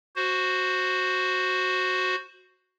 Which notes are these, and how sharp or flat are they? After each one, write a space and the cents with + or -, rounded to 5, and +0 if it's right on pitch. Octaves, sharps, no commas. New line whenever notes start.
F#4 +0 C5 +5